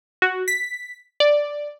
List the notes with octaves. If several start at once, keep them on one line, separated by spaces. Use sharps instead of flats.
F#4
B6
D5